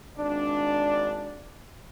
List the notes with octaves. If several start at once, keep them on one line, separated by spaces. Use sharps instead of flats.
G#1 D4